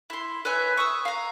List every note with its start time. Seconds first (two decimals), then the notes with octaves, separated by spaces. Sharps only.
0.10 E4 C6
0.45 B4 C#5 E5 G#5
0.77 C#6 D#6 E6
1.05 F5 A#5